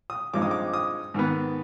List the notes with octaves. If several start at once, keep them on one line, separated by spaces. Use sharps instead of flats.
D#6
G2 F3 G#3 C4 D#4 D6
D#6
D6
D#6
G#2 D#3 B3